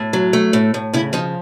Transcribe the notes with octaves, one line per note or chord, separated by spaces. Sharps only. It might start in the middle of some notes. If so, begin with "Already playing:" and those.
Already playing: A2
F#3
A3
A2
A2
C#3 E4
F3 D#4